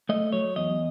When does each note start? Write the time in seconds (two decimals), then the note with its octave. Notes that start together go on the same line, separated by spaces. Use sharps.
0.09 A3 D#5
0.32 F#3 C#5
0.56 E2 D#5